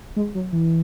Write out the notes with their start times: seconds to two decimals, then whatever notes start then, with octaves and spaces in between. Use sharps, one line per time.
0.16 G#3
0.35 F#3
0.52 E3